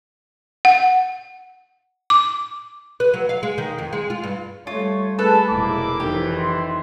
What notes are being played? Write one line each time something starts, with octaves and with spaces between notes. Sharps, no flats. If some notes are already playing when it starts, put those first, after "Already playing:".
F#5
D6
B4
F#3
F5
G#3
D#3
F2
G#3
F4
G2
G3 A3 F4 C#5
A3 G#4 A4 B4 A5
F1 B2 G#3 A#3 E4 D6
F2 D#3 E3 F#3 G4
C6